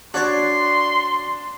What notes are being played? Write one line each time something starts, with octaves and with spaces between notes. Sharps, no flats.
D4 F#4 C#5 D5 C6